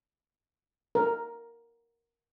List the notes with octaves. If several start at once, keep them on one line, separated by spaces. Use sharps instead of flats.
A#4